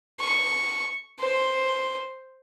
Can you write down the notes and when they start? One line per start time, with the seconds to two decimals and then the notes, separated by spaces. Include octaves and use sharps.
0.20 C#6
1.20 C5